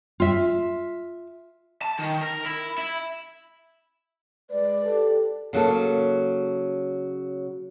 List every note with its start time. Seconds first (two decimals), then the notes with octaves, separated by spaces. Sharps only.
0.20 F4 E5
1.82 A5
1.99 D#3
2.22 A#4
2.46 E4
2.78 E4
4.51 G#3 B4 D5
4.85 G4 A4
5.53 C#3 F#3 A#3 A4